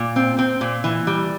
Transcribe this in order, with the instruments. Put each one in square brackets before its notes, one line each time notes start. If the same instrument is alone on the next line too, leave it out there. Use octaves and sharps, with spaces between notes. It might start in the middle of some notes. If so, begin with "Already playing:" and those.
Already playing: [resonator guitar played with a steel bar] A#2
C4
C4
A#2
E3
G3